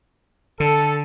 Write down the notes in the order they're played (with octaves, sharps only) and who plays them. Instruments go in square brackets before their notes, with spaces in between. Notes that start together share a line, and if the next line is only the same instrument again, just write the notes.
[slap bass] D3 [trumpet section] A4